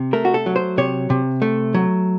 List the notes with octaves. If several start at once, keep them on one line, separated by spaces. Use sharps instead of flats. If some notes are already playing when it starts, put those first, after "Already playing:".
Already playing: C3
A3 A#4
F#4
A4
F#3
C5
C3 C#5
C3
A3
F#3